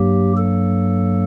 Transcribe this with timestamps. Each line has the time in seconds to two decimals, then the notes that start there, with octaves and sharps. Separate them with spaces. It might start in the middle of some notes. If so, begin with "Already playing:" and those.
Already playing: G2 F#3 A#3 G4
0.38 A4